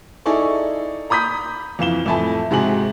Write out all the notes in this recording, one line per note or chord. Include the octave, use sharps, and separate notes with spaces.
D#4 E4 G#4 A4 D5 C#6
A#5 B5 D#6 G6 B6
F2 E3 F5 E7 G7
F2 A2 A3 G#5 A5 B5
G#2 C3 F#4 G#4 F#7